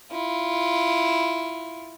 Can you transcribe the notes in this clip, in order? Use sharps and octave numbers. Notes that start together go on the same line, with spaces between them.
E4 F4